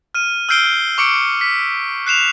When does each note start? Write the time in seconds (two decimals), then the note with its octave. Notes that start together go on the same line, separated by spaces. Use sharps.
0.15 F6 D#7
0.49 E6 F6 G6 C7 D7 G7
0.98 C#6 D6 E6 C#7 D7
1.41 B6
2.07 F#6 C7 E7 F7